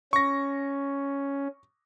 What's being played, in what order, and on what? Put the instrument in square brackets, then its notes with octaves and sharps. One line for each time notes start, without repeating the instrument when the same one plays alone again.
[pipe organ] C#4 [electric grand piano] C#6 A#6